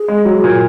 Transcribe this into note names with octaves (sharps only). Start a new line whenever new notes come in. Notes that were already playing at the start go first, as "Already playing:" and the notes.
Already playing: G#4
G#3
F#3
A#2